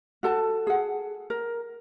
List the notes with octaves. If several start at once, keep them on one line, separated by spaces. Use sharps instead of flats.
F#4 A4 A5
G#4 F#5
A#4